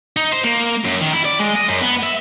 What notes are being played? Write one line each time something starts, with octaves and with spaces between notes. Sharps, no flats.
D#4
C5
A#3
F#2
D#3
E4
D5
G#3
D#5
F#2
B3
E5